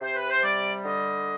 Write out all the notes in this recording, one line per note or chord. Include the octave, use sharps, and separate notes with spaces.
C3 C5
B4
C5
G3 D5
D3 D#5